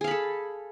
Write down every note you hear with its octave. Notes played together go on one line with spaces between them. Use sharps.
G#4 A4 F5 B5